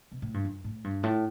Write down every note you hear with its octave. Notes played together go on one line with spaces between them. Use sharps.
B2
A2
G2
F#2
A2
G2
A2